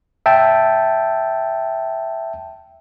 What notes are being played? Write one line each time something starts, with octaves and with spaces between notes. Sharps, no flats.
E5 G5 A5